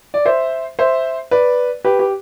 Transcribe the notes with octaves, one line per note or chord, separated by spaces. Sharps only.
D5
C5 E5
C5 E5
B4 D5
G4 B4
G4